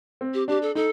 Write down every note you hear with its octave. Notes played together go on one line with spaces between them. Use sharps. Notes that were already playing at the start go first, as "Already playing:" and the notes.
C4
G4
D4 G4
A4
D#4 A4